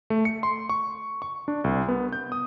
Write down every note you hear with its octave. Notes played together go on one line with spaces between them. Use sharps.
A3
C#7
C6
C#6
C#6
D4
C2
B3
G6
D#6